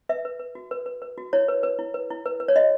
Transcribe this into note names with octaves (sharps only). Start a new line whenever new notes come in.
B4 E5
B4
B4
F#4
B4
B4
B4
F#4
E4 C#5
B4
B4
E4
B4
E4
B4
B4
C#5
F#4 D#5